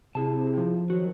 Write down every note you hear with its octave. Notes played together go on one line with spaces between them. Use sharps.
C3 E4 G#4 A5
F3
D#3 F#3 F#4